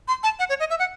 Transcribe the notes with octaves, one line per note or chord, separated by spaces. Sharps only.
C6
A5
F#5
C#5
D#5
E5
F#5